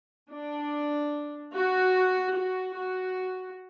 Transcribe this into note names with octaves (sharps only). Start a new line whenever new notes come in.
D4
F#4
F#4
F#4